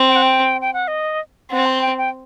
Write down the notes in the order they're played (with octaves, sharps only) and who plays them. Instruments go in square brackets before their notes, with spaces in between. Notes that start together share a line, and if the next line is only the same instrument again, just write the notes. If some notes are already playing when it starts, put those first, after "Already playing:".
Already playing: [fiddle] C4
[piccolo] G5
F#5
G5
G5
F#5
D#5
[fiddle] C4 [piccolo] F#5
[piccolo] C6
G5
G5